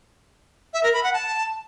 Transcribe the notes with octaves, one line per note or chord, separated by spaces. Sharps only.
E5
A#4
B5
F#5
A5